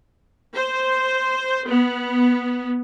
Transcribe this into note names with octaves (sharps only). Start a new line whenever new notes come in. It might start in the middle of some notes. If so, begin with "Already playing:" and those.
C5
B3